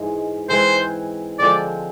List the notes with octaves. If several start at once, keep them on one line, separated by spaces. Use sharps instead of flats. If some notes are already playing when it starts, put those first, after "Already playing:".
Already playing: G#2 E3 G#3
E3 G#3 C4 C5
D3 F3 G#3 C4 D5